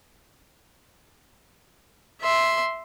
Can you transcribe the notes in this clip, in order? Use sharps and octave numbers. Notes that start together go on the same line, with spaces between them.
E5 C6